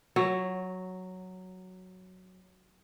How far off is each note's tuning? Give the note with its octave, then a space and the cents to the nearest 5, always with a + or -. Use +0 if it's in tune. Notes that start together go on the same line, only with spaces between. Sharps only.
F#3 +0 C#5 -20